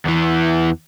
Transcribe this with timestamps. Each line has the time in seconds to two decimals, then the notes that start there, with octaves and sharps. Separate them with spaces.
0.05 E2 E3